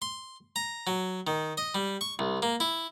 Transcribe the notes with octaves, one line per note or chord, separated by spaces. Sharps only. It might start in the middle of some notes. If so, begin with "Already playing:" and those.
C6
A#5
F#3
D#3
D#5
G3
C#6
C2
A#3
E4